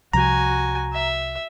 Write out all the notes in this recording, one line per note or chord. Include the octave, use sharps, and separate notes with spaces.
C2 C3 F3 F#4 G#5 A#5
E5